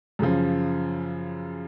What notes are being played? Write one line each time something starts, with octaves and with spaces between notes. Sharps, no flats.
F#2 C#3 F3